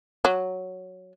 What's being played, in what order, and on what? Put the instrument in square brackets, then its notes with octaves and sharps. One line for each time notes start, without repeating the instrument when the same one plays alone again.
[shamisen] F#3